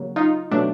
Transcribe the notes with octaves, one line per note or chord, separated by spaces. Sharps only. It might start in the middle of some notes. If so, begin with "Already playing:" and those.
Already playing: C#3 F#3 A#3
D#4 F4
B2 F#3 A3 D4